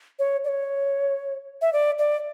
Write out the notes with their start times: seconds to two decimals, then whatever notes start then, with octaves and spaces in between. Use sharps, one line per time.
0.19 C#5
0.44 D5
0.48 C#5
1.62 E5
1.73 D5
1.99 D5